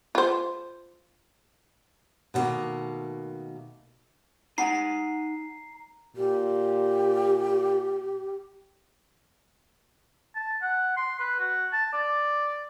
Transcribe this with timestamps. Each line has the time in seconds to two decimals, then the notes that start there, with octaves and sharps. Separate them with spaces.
0.15 F4 C5
2.34 B2 D3 D#3 A3 A#3
4.58 D#4 F#5 G#5 A#5 C7
6.17 A#2 G4
10.36 A5
10.62 F#5
10.97 C6
11.19 B4
11.39 F#4
11.73 A5
11.93 D5